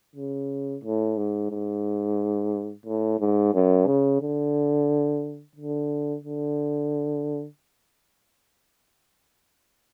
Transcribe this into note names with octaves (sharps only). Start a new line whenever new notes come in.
C#3
A2
G#2
G#2
A2
G#2
F#2
C#3
D3
D3
D3